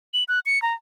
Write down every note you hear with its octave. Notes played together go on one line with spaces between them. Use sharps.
F#7
F#6
C#7
A#5